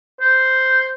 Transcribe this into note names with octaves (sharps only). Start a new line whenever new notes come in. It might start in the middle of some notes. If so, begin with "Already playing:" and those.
C5